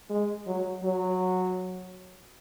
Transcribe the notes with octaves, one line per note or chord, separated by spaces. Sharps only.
G#3
F#3
F#3